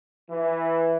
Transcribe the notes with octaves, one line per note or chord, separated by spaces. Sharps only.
E3